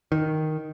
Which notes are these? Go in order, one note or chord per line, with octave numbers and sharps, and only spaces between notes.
D#3